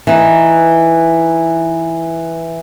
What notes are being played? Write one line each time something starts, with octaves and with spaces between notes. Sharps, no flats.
E3 D#4